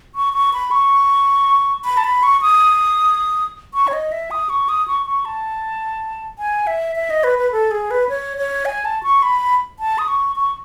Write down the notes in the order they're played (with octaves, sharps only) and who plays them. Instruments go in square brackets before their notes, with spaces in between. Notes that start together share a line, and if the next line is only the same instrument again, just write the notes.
[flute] C#6
C#6
B5
C#6
B5
A5
B5
C#6
D#6
C#6
C#5
D#5
E5
D#6
C#6
D#6
C#6
C#6
A5
G#5
E5
E5
D#5
B4
B4
A4
G#4
B4
C#5
C#5
G#5
A5
C#6
B5
A5
D#6
C#6
C#6